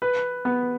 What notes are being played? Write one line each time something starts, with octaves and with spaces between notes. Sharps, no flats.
B4
B3